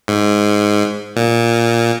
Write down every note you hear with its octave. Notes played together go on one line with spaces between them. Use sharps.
G#2
A#2